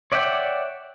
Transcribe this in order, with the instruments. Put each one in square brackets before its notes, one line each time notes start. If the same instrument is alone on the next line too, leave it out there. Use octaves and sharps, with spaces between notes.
[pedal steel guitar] C#5 D5 E5 F#5 G5